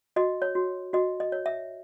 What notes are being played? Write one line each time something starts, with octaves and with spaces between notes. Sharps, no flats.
F#4 D#5
C#5
F#4
F#4 D#5
D#5
C#5
E5